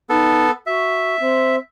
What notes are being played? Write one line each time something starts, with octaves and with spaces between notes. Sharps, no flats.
B3 D#4 A4
F#4 E5
C4